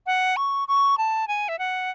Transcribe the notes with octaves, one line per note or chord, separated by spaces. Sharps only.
F#5
C#6
C#6
A5
G#5
E5
F#5